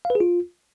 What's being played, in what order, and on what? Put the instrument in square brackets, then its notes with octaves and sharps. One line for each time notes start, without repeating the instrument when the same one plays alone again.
[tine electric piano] F5
B4
G#4
F4